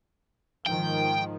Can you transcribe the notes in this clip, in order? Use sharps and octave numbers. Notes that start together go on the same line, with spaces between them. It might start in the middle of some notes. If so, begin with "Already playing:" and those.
G#2 D#3 F3 G5